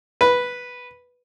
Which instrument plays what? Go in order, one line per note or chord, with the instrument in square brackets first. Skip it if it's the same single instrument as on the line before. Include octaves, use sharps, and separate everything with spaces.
[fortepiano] B4